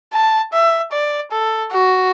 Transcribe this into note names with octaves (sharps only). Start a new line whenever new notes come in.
A5
E5
D5
A4
F#4